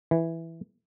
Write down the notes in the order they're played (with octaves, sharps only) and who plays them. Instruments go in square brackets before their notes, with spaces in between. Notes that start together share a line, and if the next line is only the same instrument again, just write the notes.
[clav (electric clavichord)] E3